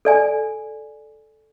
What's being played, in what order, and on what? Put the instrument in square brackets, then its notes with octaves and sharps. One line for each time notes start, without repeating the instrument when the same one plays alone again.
[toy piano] A4 D5 G#5